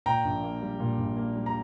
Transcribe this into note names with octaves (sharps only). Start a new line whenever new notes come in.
A#2 G5 A#5
A#1
A#3
G3
A#2
A#1
A#3
G3
A#5